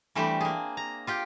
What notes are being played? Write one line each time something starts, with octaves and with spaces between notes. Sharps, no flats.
E3 G3 A3 C4 D4 G4
A#3 G#4
A#5
F4 G4 G5